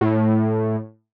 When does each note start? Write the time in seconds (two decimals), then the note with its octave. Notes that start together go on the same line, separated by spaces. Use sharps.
0.01 A2